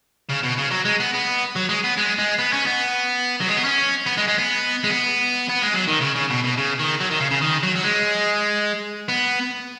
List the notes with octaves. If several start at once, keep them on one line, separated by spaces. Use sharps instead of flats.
C#3
B2
C#3
F#3
G#3
B3
B3
F#3
G#3
B3
G#3
G#3
B3
C#4
B3
F#3
G#3
B3
C#4
B3
G#3
G#3
B3
G#3
B3
B3
G#3
F#3
D#3
C#3
C#3
B2
B2
C#3
D#3
F#3
D#3
C#3
C#3
D#3
F#3
F#3
G#3
B3